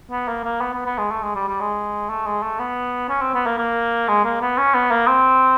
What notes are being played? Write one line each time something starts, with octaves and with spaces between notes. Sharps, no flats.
B3
A#3
A#3
B3
B3
B3
G#3
A3
G#3
G3
G3
G#3
A3
G#3
A3
B3
C#4
C4
B3
A#3
A#3
G#3
A#3
B3
C#4
B3
A#3
C4